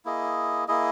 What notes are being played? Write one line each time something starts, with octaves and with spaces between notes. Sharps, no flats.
A#3 E4 G#4 D#5
A#3 E4 G#4 D#5